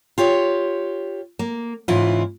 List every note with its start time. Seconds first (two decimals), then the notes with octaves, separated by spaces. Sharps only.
0.18 F4 G4 C#5
1.39 A#3
1.88 G#2 C#3 E3 E4 F4